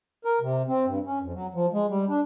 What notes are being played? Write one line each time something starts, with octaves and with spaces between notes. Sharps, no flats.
A#4
C3
C4
G2
C#4
F2
F#3
F3
G#3
G3
D4